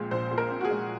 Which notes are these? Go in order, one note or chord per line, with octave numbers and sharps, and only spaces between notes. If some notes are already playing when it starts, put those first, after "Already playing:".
Already playing: A#1 A#2 G#3 C4
A#1 C5
A#2
A#4
C4
F#4
G#4
G#3